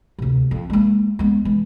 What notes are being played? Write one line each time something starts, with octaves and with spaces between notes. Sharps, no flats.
D2 C3
F2
G#3 A#3
G#3 B3
E3 G#3